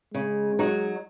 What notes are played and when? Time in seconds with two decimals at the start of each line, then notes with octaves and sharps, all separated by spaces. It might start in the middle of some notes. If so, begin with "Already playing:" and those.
0.14 C#3 G#3
0.59 F#3 D#4 F#4